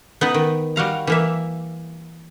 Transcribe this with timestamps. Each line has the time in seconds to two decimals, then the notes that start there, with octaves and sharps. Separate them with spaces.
0.21 B3 D#4 B4
0.34 D#3
0.76 G3 F#4 F5 A#5
1.07 E3 A#3 E5